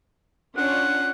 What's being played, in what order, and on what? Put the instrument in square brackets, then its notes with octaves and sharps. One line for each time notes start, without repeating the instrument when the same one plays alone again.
[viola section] C#4 D4 F4 [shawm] F#5